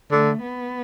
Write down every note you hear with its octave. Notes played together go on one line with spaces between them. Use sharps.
D3 A3
B3